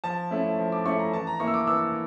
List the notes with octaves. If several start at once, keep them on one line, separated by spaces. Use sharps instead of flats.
F3 A5
A3 C#4 E4
F3
D6
A3 C#4 E4 C#6
A#5
E3 A5
A#5
A#3 E4 C#6
E6
D6
E3 E6